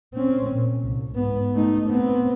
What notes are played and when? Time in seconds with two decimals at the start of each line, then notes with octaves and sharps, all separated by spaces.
0.14 C4 C#4
0.50 A#2
0.83 C2
1.15 G#2 B3
1.54 A3 D#4
1.89 B3 C4